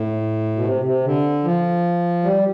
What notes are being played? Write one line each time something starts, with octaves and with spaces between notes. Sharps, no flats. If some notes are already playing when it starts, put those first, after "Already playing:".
Already playing: A2
B2
C3
C3
D3
F3
G3